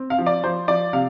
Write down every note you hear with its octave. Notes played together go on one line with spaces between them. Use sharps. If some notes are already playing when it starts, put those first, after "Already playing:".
Already playing: C4
F5
F3
D5
F3 C5
F3 D5
C3 F5